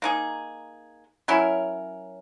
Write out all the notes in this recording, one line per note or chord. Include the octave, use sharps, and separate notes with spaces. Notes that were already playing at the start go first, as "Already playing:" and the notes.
A#3 D#4 G#4
F#3 C#4 E4 A#4